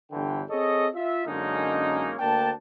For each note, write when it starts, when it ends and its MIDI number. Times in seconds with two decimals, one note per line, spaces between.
0.12 0.43 31
0.12 0.43 50
0.12 0.43 52
0.12 0.43 79
0.50 0.88 60
0.50 0.88 68
0.50 0.88 69
0.50 0.88 73
0.50 0.88 75
0.95 1.25 65
0.95 1.25 76
1.26 2.14 42
1.26 2.14 50
1.26 2.14 56
1.26 2.14 58
1.26 2.14 61
1.26 2.14 63
2.20 2.51 38
2.20 2.51 58
2.20 2.51 62
2.20 2.51 79
2.20 2.51 81